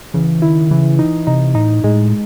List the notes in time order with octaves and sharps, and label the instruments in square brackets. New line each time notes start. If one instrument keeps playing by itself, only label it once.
[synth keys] C#3 [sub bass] E3
[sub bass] D#3 [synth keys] E4
[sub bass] C#3 [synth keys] E3
[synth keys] D#4
[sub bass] C3 [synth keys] D#4
[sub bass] A2 [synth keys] D#4
[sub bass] A2 [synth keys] G#3